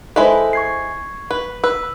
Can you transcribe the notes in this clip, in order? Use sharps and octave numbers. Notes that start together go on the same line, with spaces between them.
G#3 E4 A4 B4 C5
C#6 G#6 C7
B4
B4 E6